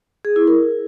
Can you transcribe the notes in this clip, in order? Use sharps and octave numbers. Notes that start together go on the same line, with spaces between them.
G#4
E4
A#4